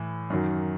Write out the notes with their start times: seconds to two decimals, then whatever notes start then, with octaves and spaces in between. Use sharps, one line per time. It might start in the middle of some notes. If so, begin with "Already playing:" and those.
Already playing: A2 E3
0.30 F#2 D#3 F#3